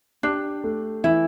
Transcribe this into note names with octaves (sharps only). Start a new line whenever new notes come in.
D4 G4
A3
E3 E4